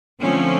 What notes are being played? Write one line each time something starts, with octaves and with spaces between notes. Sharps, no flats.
D3 F3 A3 C4 C#4